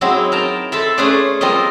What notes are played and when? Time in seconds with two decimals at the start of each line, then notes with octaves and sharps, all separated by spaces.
0.01 F#3 G#3 C4 D#4 E4
0.32 A#4 G5 A5 A#5
0.72 A4 C5 E5 A5 B5
0.98 A3 C#4 G#4 B4 C5 D5
1.41 F3 G3 C4 F4 A#4 D#5